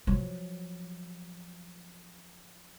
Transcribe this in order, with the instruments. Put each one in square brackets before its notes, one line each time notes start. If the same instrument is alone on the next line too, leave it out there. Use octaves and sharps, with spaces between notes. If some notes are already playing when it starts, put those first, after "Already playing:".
[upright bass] F3 F#3